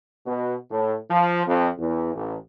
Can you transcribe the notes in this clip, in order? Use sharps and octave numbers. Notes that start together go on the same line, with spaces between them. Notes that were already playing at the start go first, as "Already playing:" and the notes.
B2
A2
F3
F2
E2
A1